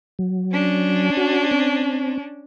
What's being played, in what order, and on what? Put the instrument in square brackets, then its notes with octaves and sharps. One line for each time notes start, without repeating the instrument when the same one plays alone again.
[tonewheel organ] F#3
[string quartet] C#4 D4
[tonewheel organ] F#4
C4